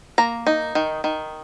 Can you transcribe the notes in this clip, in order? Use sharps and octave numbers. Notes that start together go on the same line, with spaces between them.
A#3 A#5
D#4
D#3
D#3